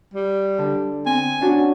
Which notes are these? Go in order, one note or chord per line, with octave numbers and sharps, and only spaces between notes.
G3
D3
C4 G#5
C#4 D4 F#4